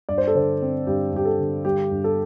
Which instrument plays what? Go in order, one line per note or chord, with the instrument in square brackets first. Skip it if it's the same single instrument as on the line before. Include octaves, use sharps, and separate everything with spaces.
[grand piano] G2 D5
C5
A4
D3 C5
C4
G2 G4
G2 G4
A4
D3
G3 G4
G2
A4